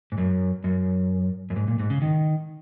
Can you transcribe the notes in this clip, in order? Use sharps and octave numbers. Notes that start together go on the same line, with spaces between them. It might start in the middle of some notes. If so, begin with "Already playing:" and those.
G#2
F#2
F#2
F#2
G#2
A#2
G#2
C#3
D#3